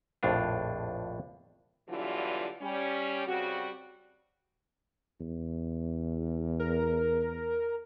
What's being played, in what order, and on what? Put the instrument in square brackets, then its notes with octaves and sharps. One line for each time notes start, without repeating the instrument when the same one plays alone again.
[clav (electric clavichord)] A#1 F2 A2 D4 F4
[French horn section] B2 D3 E3 F#3 G3 F4
G3 C#4
C#3 G3 C4 F#4
[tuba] E2
[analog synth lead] A#4